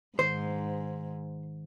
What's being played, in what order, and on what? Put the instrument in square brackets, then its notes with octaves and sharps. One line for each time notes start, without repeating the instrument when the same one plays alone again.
[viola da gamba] G#2 [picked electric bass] D#3 [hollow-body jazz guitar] C5